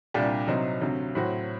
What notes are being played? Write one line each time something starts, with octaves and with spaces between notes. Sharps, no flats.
C2 A#2 G3 D4 G4
C2 C3 F#3 C4 D#4
D2 C3 F#3
A2 F#3 C4 F#4